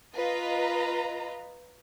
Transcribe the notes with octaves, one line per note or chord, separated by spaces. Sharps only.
F4 B4 D#5 A#5